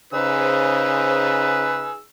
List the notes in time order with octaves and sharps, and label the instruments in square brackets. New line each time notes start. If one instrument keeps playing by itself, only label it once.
[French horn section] C#3 C5 [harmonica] D#4 G#4 E6 [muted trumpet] B4